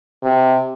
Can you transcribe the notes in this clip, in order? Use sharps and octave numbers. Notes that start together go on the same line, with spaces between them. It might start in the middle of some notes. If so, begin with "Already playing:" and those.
C3